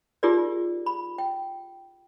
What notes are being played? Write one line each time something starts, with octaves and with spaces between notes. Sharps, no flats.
D#4 F4 G4 G#4 A#4 D5
B5
G5